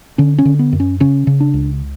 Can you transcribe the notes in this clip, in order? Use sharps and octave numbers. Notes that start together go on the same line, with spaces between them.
D3 C#4
C#4
D3
B3
F#2
C#4
C#3 C#4
C#3
D4
C#2